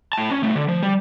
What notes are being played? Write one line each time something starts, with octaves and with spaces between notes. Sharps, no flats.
A2 A5
C#4
B2 A3
D3
F3
G3